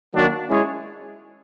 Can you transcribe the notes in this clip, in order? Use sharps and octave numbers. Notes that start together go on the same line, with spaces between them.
D#3 F#3 A#3 D4 F#4
G#3 C#4 E4 G#4 C#5